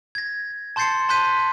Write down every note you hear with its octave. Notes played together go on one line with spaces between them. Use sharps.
G#6 A#6
A5 C6 G6 A6 C7 C#7
A5 C6 F#6 G6 B6 D#7